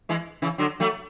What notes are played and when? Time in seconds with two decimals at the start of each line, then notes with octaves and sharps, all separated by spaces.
0.09 E3 G#3
0.42 C#3 E3
0.58 D3 F#3
0.80 F#3 A3